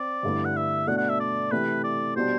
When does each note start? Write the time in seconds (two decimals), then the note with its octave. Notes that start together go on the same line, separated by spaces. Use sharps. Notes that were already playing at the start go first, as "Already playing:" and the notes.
Already playing: C4 D5
0.23 G1 G2 D3 A3 E4
0.45 F#5
0.56 E5
0.87 B2 A3 D4 F#5
0.98 F#5
1.09 E5
1.20 D5
1.51 C3 E3 A3 B4
1.84 D5
2.16 B2 G3 D4 C5